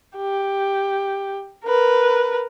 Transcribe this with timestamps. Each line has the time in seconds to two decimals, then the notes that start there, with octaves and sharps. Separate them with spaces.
0.17 G4
1.64 A#4 B4